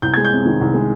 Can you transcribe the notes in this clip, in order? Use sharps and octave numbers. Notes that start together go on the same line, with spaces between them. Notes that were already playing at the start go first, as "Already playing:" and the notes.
C2 G6
G#3 G#6
G6
C3
D#3
C2
G#3